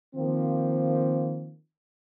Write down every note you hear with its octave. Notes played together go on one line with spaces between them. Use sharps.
D#3 F3 A#3 C4